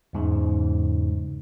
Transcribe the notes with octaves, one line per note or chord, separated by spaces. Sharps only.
E2 G#2 C#3